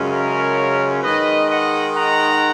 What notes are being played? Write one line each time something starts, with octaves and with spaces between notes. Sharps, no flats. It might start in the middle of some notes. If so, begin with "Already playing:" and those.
Already playing: F#2 C#3 G#3 C#4 F4
A#4 C#5
D#3 G#3 D#4 B4 D#5
D#5 F#5
F#5 A#5